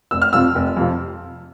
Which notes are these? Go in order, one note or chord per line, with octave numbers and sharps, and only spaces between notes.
F1 E6
F6
F2 C3 F3 E6
F1
F2 C3 F3